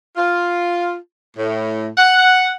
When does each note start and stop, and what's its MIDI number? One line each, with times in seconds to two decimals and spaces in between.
0.17 0.95 65
1.37 1.87 45
1.98 2.53 78